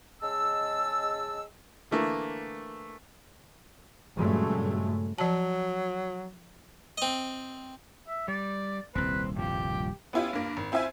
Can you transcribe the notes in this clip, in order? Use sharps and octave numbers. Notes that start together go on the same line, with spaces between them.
C#3 G#3 D#5 A5 E6
D3 E3 A3 A#3
G2 A#2 C#3 F#3 G#3 A3
F3 F#3 A5
C4 D#5
E5
G3 D5
D#1 C2 C4 B4
G2 F3 G4
B3 C#4 E4 F4 G4
G2 A#3
G#1
C4 E4 F4 E5 F5 G#5